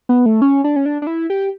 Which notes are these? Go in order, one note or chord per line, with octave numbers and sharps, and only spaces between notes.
B3
A3
C#4
D4
C#4
D4
D4
E4
G4